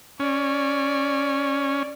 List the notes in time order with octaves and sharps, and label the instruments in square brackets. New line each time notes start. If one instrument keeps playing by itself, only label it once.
[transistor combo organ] C#4 [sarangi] D5